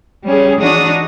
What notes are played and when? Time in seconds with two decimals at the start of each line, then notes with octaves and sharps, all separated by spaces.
0.24 G3 C#4 G#4
0.59 E3 D4 D#4 F#4 D#6 A#6